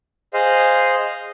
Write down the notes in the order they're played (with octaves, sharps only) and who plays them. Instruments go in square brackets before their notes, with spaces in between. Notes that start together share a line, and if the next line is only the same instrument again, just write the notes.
[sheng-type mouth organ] G#4 C5 D#5 F5